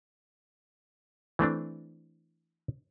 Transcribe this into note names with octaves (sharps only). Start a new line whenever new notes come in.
E3 A3 C4 D4